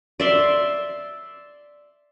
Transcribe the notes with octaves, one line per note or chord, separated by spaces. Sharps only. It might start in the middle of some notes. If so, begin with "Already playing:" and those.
D5 E5 C6